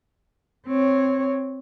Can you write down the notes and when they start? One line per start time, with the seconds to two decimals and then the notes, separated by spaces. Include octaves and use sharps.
0.67 C4 C#5